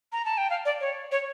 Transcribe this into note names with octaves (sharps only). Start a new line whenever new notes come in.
A#5
A5
G5
F5
D5
C#5
C#5